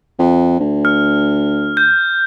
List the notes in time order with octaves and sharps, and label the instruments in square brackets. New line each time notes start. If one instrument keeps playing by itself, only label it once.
[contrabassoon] F2
D2
[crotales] F6
G6